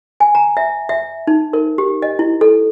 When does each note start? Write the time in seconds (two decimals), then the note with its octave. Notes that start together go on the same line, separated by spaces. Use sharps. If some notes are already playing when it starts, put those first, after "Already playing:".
0.20 G#5
0.35 A#5
0.57 E5
0.89 E5
1.27 D#4
1.53 A#4
1.78 G4
2.02 D#5
2.19 E4
2.41 A4